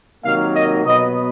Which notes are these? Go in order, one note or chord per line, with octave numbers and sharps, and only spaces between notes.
C3 D#3 F#3 A#3 F5
D#5
B2 F#3 B3 D#5